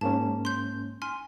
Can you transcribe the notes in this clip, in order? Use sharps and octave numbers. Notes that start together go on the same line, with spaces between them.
G#2 A#3 C#4 A5
C6 G6
G#5 C6 F6